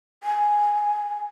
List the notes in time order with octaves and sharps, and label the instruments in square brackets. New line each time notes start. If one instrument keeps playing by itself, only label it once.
[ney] G#5